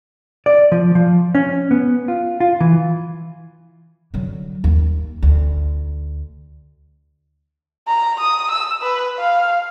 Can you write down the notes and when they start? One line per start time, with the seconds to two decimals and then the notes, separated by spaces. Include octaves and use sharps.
0.46 D5
0.72 F3
0.95 F3
1.35 C#4
1.71 B3
2.08 F4
2.40 F4
2.61 E3
4.14 D3 F#3
4.64 D#2
5.23 D2
7.87 A#5
8.20 D#6
8.51 E6
8.82 B4
9.19 F5